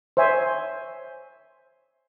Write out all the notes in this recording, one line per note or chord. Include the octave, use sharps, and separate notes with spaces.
C5 C#5 E5 G#5